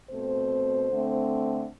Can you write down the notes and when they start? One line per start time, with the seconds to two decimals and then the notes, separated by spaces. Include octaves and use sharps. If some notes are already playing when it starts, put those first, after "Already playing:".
0.10 B2 A3 C4 C5
0.89 D3 A3 C4